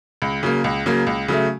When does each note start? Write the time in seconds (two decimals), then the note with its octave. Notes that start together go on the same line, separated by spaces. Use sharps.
0.22 C#2
0.43 C#3 F#3 A#3
0.64 C#2
0.86 C#3 F#3 A#3
1.07 C#2
1.28 C#3 F#3 A3